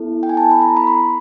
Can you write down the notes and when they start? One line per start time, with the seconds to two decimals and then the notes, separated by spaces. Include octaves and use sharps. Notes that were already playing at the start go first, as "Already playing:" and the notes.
Already playing: B3 E4 A4
0.23 G5
0.29 G#5
0.37 A5
0.51 B5
0.62 A#5
0.77 B5
0.87 C6